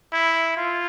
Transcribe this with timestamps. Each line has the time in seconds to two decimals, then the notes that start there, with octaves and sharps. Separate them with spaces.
0.12 E4
0.57 F4